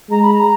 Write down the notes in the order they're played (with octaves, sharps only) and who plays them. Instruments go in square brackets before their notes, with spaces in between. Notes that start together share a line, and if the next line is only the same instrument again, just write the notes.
[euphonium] G#3 [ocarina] A#5
[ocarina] B5
A#5